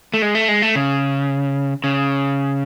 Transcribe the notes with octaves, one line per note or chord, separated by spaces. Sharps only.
A3
G#3
A3
G#3
A3
C#3
C#3